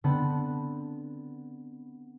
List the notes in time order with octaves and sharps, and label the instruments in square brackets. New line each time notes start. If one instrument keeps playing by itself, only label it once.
[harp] D3 B3 C4 A5 B5